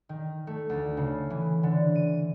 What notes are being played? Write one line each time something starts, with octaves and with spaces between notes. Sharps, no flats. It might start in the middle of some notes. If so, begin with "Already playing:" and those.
D#3
A3
D2
C#3
E3
D3
D#7